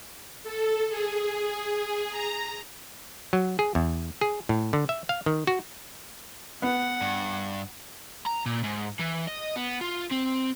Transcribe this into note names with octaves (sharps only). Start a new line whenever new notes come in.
A4
G#4
A#5
F#3
G#4
E2
G#4
A2
D3
E5
F5
D#3
F#4
B3 F#5
G2
A#5
A#2
G#2
E3
D#5
B3
F4
C4